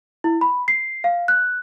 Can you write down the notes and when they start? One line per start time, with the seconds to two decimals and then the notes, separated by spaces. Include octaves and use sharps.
0.24 E4
0.41 B5
0.68 C7
1.04 F5
1.28 F#6